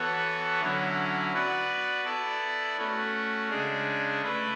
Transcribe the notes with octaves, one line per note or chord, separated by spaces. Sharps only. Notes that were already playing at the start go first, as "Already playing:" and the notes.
Already playing: E3 B3 F#4 A4 C#5
D3 F#3 C#4 E4
B3 F#4 B4 D5
B3 E4 A4 D5
A3 C#4 F#4
C#3 G#3 D4 G#4
A3 E4 B4